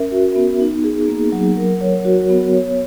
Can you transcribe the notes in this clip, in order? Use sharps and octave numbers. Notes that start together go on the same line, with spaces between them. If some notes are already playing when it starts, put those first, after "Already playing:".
Already playing: C#4 A#4 E5
F#4
B3
D#4
G#4
A#3
F#3
A#4
C#5
F#4
B3
C#5